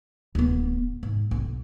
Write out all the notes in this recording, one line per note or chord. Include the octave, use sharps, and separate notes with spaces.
D1 B3
G#2
B1